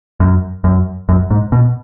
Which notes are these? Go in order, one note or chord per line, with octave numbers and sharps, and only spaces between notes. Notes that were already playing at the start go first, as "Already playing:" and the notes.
F#2
F#2
F#2
G#2
B2